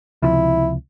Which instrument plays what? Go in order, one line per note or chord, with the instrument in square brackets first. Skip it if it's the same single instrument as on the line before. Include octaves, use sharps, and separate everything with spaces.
[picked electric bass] C#2 C3 F3 [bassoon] E4